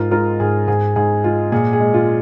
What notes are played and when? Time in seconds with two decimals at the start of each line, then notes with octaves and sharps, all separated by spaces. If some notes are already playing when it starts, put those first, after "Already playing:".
Already playing: G#2 F4 A#4
0.11 G#3 F4 A#4
0.40 G#2 G#4
0.67 G#2 G#4
0.96 G#2 G#4
1.24 G#3 F4
1.52 A#2 G#4
1.73 G#4
1.80 G#3
1.94 F4